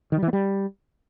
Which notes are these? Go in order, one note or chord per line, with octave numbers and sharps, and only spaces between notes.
D#3
G3
E3
B3
G3